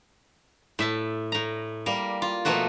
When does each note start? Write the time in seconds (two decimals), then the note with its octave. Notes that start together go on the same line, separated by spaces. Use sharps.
0.79 A2 E5 A5
1.32 A2 A#5
1.86 G3 A#3 A#4
2.22 F4
2.45 B2 F3 A3 A#3 F#4